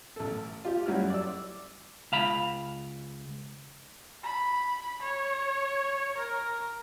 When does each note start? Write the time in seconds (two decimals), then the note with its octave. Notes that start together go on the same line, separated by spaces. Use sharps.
0.16 A1 A4
0.65 F4 G4
0.86 F#2 F#3 G3 E4 F6
1.10 D5 E6
2.12 C#2 F5 B5
4.23 B5
5.02 C#5
6.17 A#4